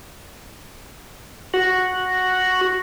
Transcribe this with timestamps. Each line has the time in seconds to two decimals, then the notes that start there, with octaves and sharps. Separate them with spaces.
1.54 F#4